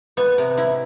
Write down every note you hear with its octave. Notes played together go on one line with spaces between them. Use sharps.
B3 B4
C3
E4